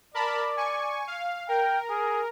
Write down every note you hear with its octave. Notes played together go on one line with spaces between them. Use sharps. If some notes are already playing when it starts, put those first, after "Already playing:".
A#4 D5 A5 B5
G#5 C#6
F5
A#4 G5
G#4